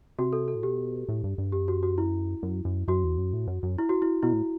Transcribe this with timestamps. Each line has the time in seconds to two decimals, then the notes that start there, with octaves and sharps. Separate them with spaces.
0.19 C3 F#4
0.33 A4
0.48 A4
0.55 A2
0.63 B2 G4
1.09 A2
1.24 G2
1.38 G2
1.52 F#2 G4
1.68 F#4
1.83 F#4
1.98 E4
2.43 F#2
2.65 F#2
2.88 F#2 F#4
3.04 E2
3.18 F#2
3.33 A2
3.48 F#2
3.63 F#2
3.78 E4
3.89 F#4
4.02 E4
4.23 B2 E4
4.33 A2